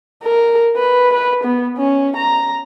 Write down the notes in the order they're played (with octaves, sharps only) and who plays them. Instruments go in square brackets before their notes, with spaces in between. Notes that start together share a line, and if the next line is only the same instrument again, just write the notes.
[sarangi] A#4
B4
B4
B3
C#4
A#5